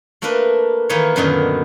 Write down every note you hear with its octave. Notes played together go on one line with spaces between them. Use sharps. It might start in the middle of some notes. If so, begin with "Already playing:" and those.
A3 A#3 D4 A#4 B4
D#3 E3 A#3 D#4 B4 C#5
F#2 A#2 D3 D#3 B3 D#4